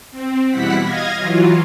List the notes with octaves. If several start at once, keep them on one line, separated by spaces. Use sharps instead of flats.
C4
E2 B2 G3 E4 F#5 B6
D#5 F5 G#6 A#6
E3 F#3 F4